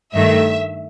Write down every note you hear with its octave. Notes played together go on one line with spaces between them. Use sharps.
G2 D#3 A3 E5